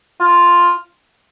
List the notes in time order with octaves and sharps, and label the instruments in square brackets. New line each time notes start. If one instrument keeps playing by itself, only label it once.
[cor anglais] F4